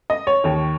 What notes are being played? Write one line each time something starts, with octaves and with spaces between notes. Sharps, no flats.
D#5
C#5
D#2 D#3